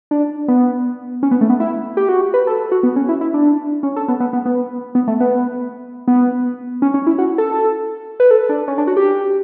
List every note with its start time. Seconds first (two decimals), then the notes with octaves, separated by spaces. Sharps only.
0.11 D4
0.48 B3
1.23 C#4
1.31 B3
1.41 A3
1.50 B3
1.60 E4
1.97 G4
2.09 F#4
2.21 G4
2.34 B4
2.47 A4
2.72 F#4
2.83 B3
2.96 C#4
3.09 E4
3.21 E4
3.34 D4
3.83 C#4
3.96 A4
4.08 B3
4.20 B3
4.33 B3
4.46 B3
4.95 B3
5.08 A3
5.20 B3
6.08 B3
6.82 C#4
6.94 C#4
7.07 E4
7.18 F#4
7.38 A4
8.20 B4
8.31 A4
8.49 D4
8.68 C#4
8.78 D4
8.87 F#4
8.97 G4